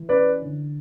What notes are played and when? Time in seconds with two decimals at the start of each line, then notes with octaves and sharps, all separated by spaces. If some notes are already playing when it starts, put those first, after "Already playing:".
Already playing: E3
0.09 C#4 B4 D5
0.42 D3